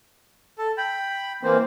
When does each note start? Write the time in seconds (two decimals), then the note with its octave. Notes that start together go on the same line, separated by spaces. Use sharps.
0.58 A4
0.78 G5 B5
1.43 E3 A#3 C4 C5